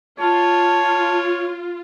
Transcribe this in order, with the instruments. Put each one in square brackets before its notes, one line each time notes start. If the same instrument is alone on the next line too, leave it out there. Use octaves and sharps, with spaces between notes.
[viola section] F4 [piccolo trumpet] C#5 [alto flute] A5